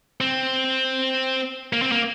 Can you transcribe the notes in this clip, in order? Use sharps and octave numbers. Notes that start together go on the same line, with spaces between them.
C4
A#3
C4
A#3